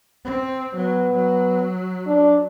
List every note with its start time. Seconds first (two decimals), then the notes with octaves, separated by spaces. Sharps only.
0.24 C4
0.76 F#3 B3
1.13 F#3
2.07 D4